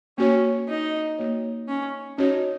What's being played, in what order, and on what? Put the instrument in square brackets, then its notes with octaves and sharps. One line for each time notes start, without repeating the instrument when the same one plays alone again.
[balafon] A#3 F#4 C#5 [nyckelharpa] C#4
[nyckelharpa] D#4
[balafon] A#3 F#4 C#5
[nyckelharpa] C#4
[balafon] C#4 F#4 C#5 [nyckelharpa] D#4